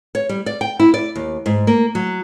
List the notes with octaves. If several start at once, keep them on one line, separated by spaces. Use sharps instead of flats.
C#5
G3
D5
G5
E4
D5
D#2
G#2
A#3
F#3